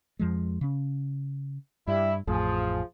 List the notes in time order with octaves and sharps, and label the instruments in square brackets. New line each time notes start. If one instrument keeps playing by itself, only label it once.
[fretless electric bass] F2 F3 G#3
C#3 C#4
[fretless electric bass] G2 [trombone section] G3 E4
[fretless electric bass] A1 F2 A2 [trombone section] F3 G#4